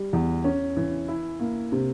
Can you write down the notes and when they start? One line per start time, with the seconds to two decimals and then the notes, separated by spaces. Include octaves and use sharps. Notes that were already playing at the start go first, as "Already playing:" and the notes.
Already playing: G3
0.13 E2
0.44 C#4
0.77 E3
1.08 E4
1.40 A#3
1.72 C3